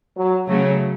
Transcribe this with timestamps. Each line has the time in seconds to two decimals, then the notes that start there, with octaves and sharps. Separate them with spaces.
0.17 F#3
0.47 C#3 F#3 A3